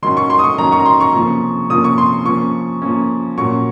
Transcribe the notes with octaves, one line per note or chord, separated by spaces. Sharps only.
D#3 F#3 C#4 C6
C#6
C6
D#6
C#6
D#3 F#3 C#4 A#5
C#6
A#5
C6
C#6
C3 F3 A#3 C#4
C3 F3 A#3 C#4 D#6
C#6
C6
F3 A#3 C#4 C#6
F3 A#3 C#4
A#2 F#3 C#4 C#6